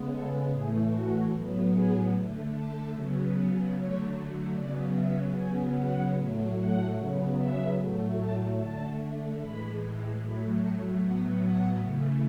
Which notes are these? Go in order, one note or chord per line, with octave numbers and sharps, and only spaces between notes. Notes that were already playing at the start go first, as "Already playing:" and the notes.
Already playing: C#3 G#3 B3
A4
A2 E3 A3 G#4
F#4
A2 F#3 B3
G#4
D3 A3
A4
C#3 F#3 B3
D3 F#3 A3 C#5
C#3 F#3 B3 D5
E5
C#3 F#3 B3 G#5
F#5
A2 F#3 A3
F#5
C#3 F#3 B3
E5
A2 F#3 A3
A5
D3 A3 A5
A2 E3 G#3 B5
A2 F#3 A3 B5
A5
A2 F#3 B3 F#5
F#5
C#3 E3 A3